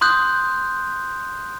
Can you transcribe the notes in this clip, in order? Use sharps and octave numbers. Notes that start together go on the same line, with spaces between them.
C6 D#6 F#6 G6